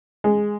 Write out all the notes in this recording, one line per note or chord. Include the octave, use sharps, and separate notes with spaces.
G#3